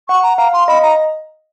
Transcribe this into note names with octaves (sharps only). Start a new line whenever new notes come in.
F#5 C#6
A#5
F5 A#5
F5 C6
D#5 B5
A#5